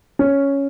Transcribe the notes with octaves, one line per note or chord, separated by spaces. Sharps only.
C#4